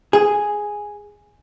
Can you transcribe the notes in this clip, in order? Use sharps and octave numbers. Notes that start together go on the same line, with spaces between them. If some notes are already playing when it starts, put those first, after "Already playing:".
G#4